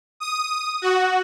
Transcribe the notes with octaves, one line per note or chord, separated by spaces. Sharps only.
D#6
F#4